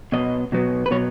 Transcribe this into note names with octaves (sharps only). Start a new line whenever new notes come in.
B2 F#3 B3 D#5
B2 F#3 B3
B4
B2 F#3 B3 C#5